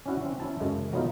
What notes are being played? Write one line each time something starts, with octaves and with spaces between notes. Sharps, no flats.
C#4 D4 E4 F#4
C4 C#4
C#4 E4 A5
F#2 C#3 G#3 A3
E3 F#3 A3 B3 D#4 F4